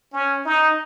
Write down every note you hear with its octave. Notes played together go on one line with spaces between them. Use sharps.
C#4
D#4